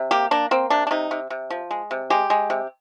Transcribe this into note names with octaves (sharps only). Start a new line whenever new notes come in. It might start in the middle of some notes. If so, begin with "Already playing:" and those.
Already playing: C3
A#3 G4
A#3 D4
A#3 C4
C3 D4
D4
C3 D#4
C3
C3
F3
G#3
C3
G#3 G4
G#3
C3